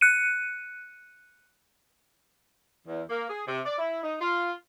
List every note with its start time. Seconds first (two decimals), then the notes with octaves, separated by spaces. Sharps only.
0.01 F#6 C#7 D#7
2.87 E2
3.10 A#3
3.29 G#4
3.47 C3
3.65 D5
3.78 E4
4.03 D#4
4.20 F4